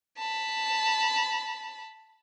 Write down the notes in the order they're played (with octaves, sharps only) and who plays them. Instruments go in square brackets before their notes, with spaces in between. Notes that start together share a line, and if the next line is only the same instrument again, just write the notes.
[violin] A5 B5